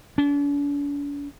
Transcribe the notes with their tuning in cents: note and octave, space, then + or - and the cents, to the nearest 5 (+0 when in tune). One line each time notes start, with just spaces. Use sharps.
D4 -45